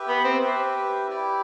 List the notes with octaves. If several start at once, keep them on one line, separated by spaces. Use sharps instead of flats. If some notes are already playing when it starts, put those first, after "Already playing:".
Already playing: G4 B4 E5
B3
C4
G4 B4 E5
E4 G4 D5